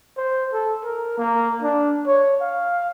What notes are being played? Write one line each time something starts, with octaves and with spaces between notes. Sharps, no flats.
C5
A4
A#4
A#3
D4
C#5
F5